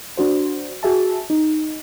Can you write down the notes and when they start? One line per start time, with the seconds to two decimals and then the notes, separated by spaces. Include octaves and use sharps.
0.17 D4 F#4 C5
0.83 F#4 G#4 E5 A5
1.30 D#4